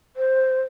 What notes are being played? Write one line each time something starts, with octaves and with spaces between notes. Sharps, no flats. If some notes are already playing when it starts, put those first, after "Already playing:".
C5